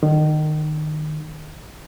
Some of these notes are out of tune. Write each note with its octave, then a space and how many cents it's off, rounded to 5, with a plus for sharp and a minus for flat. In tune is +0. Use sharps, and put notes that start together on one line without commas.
D#3 -25